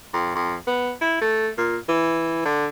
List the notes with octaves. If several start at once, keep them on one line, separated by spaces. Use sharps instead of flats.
F2
F2
B3
E4
A3
A#2
E3
D3